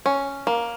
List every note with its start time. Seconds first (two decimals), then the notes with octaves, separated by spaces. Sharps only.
0.06 C#4
0.47 A#3